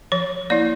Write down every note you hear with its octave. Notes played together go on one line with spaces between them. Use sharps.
F3 C#5
A#3 E4 D5